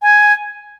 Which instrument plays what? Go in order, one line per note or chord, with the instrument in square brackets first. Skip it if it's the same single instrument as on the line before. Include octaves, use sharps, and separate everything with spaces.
[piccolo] G#5